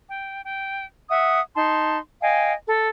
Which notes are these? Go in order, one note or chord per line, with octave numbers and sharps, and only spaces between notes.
G5
G5
E5 F#5 D#6
D#4 A5 C6
D#5 F5 G5 G#5
A4